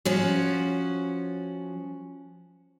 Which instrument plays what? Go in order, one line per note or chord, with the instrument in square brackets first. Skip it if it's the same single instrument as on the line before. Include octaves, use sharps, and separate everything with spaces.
[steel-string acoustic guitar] F3 C#4 F#4